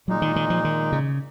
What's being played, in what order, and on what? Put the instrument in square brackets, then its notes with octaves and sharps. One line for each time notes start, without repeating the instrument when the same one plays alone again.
[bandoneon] A#2 G#3 D#4 [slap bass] F#3
[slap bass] D#3
D#3
F3
D#3
C#3